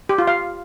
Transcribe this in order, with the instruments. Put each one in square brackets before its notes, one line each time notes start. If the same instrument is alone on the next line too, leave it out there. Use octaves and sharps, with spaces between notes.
[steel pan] G4
F4
F5